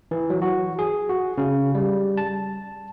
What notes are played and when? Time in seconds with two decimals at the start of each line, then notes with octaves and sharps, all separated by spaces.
0.11 E3
0.30 F#3
0.42 F#4
0.79 G#4
1.10 F#4
1.38 C#3
1.75 G3
2.18 A5